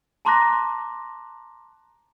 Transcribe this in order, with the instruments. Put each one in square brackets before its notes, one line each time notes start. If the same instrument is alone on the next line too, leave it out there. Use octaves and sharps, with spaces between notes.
[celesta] A5 A#5 C6 D6 F#6 A#6